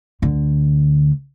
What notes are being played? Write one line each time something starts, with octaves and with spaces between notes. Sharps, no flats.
D2 D3